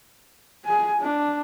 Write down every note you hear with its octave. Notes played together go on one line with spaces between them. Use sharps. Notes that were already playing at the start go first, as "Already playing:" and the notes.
G#4 G#5
D4